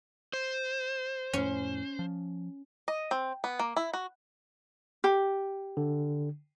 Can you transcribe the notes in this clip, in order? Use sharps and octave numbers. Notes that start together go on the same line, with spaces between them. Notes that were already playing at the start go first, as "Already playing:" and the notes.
C5
F2 A2 C#4
F3
D#5
C4
B3
A#3
E4
F#4
G4
D3